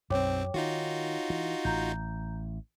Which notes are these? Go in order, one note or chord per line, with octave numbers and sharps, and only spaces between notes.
B1 F#2 C4 C#5 G5 D6
D#3 D#4 F4 F#4
E3
A1 A#5 G6